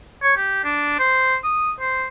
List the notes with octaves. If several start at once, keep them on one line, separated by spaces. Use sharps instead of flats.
C#5
G4
D4
C5
D#6
C5